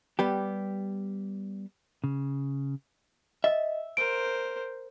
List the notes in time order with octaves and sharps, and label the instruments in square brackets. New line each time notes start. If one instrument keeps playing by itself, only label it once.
[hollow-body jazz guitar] G3 B3 G4
[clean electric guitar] C#3
[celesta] D#5 [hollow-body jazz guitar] E5
[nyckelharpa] A#4 C5 [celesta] D7